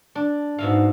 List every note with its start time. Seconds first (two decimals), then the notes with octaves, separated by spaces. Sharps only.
0.15 D4
0.58 G#2 B2 E5 F5